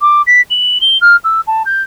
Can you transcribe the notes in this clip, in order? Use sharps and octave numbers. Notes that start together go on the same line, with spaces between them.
D6
B6
F#7
G7
F6
E6
A5
G6